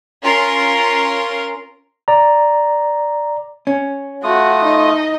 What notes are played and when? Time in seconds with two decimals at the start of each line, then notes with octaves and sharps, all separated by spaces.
0.24 C#4 F4 A#4 C6
2.08 D5 A#5
3.67 C#4
4.24 A3 F4 F#4 D#6
4.64 D#4 D#5